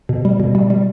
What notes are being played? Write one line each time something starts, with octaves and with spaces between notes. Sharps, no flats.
B2
G3
B2
G3
G3